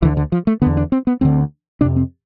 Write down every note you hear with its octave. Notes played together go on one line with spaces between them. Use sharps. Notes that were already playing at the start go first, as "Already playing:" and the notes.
D2 D3 E3
D3
F3
A3
E2 D3 B3
D4
C4
B3
D2 D3 C4
F2 C3 D4
C4